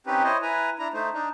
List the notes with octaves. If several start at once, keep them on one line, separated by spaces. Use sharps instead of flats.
C4 C#4 D#4 G4 B4
E4 C5 C#5 D#5
E4 B4 G#5 A#5
D4 E4 A#5
A3 D#4 C5
D4 D#4